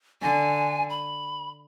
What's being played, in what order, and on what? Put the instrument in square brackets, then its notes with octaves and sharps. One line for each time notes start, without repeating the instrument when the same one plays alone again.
[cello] D3 [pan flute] G#5
[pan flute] B5